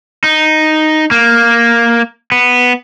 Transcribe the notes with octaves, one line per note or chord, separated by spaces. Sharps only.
D#4
A#3
B3